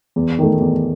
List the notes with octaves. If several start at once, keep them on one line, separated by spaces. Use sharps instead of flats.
E2
D#3 A3
E2